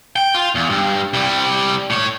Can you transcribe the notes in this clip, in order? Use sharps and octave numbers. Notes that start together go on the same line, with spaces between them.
G5
F4
E2
G2
C2 G3
A2 C#5